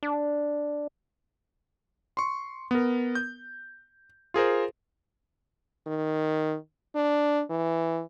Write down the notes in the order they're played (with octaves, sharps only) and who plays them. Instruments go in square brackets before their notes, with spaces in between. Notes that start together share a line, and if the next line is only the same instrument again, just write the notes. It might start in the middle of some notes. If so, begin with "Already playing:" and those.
[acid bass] D4
[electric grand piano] C6 C#6
B3 A#4
G6
F4 G#4 A#4 C5
[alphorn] D#3
D4
E3